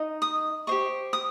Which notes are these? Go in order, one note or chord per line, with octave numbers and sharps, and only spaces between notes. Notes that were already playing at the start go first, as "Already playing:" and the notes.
Already playing: D#4 D#5
D#6
G4 C5 D#5 C#6
D#6